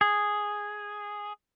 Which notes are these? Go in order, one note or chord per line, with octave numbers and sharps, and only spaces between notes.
G#4